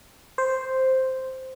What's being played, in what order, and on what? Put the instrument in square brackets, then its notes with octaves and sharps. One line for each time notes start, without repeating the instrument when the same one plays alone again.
[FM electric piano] C5